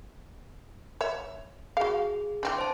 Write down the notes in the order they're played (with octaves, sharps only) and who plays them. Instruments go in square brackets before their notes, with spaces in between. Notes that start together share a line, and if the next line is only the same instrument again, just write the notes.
[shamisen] C#5 E5
[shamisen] F#4 F5 [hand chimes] G#4
[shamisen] E3 C4 D4
[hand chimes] C5 A5